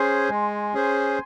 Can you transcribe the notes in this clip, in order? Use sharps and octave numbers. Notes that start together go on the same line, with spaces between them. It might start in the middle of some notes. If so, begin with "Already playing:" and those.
Already playing: C#4 G#4 C5 G#5 C6
G#3
C#4 G#4 C5